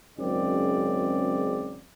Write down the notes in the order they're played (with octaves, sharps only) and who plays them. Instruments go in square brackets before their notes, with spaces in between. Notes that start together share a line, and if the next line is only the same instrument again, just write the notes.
[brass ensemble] G#1 F#2 C#3 G#3 C4 D5